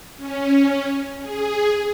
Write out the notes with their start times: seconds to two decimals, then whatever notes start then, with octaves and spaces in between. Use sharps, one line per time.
0.17 C#4
1.21 G#4